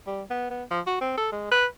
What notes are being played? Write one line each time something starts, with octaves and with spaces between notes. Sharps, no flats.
G3
B3
B3
F3
F#4
C4
A4
G#3
B4